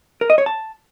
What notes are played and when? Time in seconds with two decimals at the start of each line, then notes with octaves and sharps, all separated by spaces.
0.21 A#4
0.30 D#5
0.38 C#5
0.46 A5